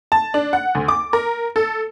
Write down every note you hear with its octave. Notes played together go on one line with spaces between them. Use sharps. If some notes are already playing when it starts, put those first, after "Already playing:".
A5
D4
F#5
D2
D6
A#4
A4